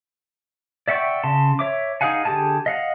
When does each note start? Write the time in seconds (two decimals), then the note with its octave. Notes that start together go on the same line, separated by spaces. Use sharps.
0.88 D5 E5 F#5 G5 C#6
1.23 C#3 A5 C6
1.59 C#5 E5 D6
2.01 D#4 G#4 F5 F#5 G#5
2.25 D3 G4 G#4 G#5 A5
2.66 D#5 F5 F#5